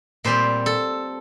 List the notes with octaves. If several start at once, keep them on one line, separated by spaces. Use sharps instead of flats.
A#2 G3 C4 C5
A4